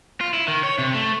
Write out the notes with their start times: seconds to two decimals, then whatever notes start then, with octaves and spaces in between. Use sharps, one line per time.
0.21 F4
0.33 E4
0.48 D#3
0.63 C#5
0.78 C3
0.94 A3